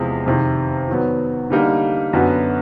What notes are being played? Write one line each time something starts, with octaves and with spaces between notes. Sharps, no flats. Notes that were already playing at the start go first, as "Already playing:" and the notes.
Already playing: E2 C3 F3 G#3
F2 C3 D#3
D#3 F#3 B3
D3 G3 A#3 D#4
F#2 D3 F#3 B3